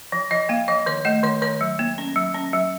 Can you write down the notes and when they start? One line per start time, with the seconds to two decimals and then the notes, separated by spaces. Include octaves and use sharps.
0.12 F3
0.31 F3 D#5
0.49 A#3 F5
0.68 F3 D#5
0.86 D#3 C#5
1.05 A3 D#5
1.23 D#3 C#5
1.42 D#3 C#5
1.61 F#3
1.79 A#3
1.98 C#4
2.16 F#3
2.34 C#4
2.53 F#3